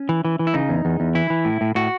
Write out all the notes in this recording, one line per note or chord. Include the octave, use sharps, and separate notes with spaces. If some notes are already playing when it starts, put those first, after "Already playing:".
Already playing: C#4
E3
E3
E3
E4
C#3 D#4
E2
E2
E2
E3 E4
E3
A2
A2
A2 F#4